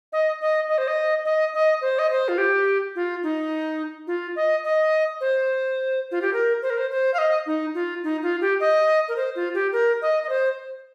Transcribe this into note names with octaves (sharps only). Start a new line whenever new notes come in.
D#5
D#5
D#5
C5
D#5
D#5
D#5
C5
D#5
C5
F4
G4
F4
D#4
F4
D#5
D#5
C5
F4
G4
A#4
C5
A#4
C5
C5
F5
D#5
D#4
F4
D#4
F4
G4
D#5
A#4
C5
F4
G4
A#4
D#5
D#5
C5